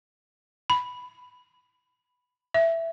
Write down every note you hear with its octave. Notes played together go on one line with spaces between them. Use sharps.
B5
E5